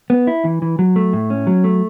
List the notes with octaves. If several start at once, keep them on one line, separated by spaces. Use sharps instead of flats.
B3
E4
E3
E3
F#3
A3
A2
C#4
F#3
A3